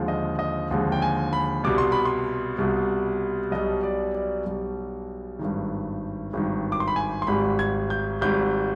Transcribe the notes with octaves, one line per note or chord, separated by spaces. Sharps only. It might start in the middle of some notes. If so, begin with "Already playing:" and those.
Already playing: D#2 D3 F3 G#3
D#5
D#5
D#2 D3 F3 G#3
G5
G#5
B5
C2 B2 G3 D6
C6
B5
C6
C2 B2 G3
B1 B2 G3 D#5
D5
D5
B1 B2 G3
G#1 G2 D#3
G#1 G2 D#3
D6
C6
B5
G#5
C6
G#1 G#2 G3 B5
G#6
G6
G#1 G#2 G3 G6